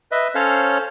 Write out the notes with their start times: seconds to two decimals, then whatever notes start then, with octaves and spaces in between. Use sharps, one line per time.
0.12 B4 D#5 E5
0.35 C#4 A4 C5 C#5 F5